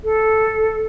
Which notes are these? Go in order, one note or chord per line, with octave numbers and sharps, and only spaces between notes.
A4